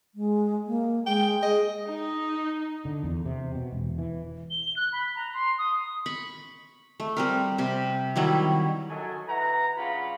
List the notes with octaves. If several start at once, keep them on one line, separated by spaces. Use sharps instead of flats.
G#3
A#3
G#3 G5
G#4 D#5
D#4
D3
E2
C3
B2
E1
E3
G7
F#6
B5
A#5
C6
D#6
B5 C#6
A3
G3 C4 A#4
C3 G4
D#3 F#3 G3 E4
F#2 F#3 A4 D#5 G#5
E4 B4 F#5 A#5
G2 C#3 G3 F4 F#5 B5